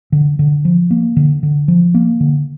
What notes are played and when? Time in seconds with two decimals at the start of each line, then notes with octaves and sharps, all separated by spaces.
0.12 D3
0.39 D3
0.65 F3
0.91 A#3
1.17 D3
1.43 D3
1.68 F3
1.95 A#3
2.20 D3